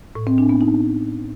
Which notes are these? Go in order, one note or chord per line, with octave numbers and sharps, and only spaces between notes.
A2
C4
D4
B3
D#4